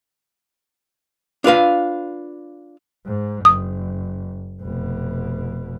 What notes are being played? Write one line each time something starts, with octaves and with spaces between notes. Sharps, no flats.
D4 F4 B4 F5
G#2
F#1 D#6
F1 B2